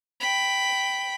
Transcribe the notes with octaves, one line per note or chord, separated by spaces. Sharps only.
G5 B5